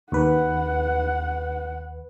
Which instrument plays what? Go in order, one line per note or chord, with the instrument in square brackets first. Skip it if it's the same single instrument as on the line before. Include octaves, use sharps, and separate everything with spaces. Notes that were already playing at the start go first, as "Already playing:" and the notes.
[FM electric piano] D#2 B4 [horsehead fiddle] F#5